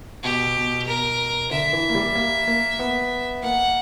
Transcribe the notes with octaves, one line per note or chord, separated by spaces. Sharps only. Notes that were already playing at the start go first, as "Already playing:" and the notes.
B2 G4
B2
B2 A#4
D3 E5
E3
A#3
G3
A#3
A#3
B3
A#3 F#5